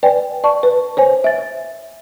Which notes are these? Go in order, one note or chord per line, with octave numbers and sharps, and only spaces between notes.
B4 D5 G5 G#5
D5 A5 C#6
B4
C5 C#5 G#5
E5 A6